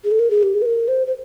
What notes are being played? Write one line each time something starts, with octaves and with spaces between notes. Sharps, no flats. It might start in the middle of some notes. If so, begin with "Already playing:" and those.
G#4
A4
A#4
G#4
G4
G#4
B4
A#4
C5
C5